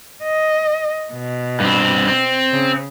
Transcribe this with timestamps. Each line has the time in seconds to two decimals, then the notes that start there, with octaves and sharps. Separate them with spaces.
0.23 D#5
1.13 B2
1.60 G2 C4
2.08 C4
2.51 C#3